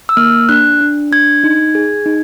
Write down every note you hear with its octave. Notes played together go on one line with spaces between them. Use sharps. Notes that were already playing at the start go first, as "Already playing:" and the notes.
E6
A#3 F6
D4 F#6
D4
D4 G#6
D#4
G#4
D#4